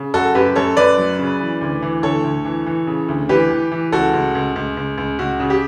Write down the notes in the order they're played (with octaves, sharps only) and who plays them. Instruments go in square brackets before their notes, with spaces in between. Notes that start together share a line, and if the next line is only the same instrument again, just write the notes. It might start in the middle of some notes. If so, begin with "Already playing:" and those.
Already playing: [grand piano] C#3
F#2 F#4 A4
F#2 G4 B4
F#2 A4 C#5
F#2 B4 D5
F#3
C#3
E3
D2
E3
D2 A4 C#5
D2
E3
E3
C#3
D2
E3 G4 B4
E3
E3
C#2 F#4 A4
C#2
C#2
C#2
C#2
C#2
C#2 F#4
C#3
G4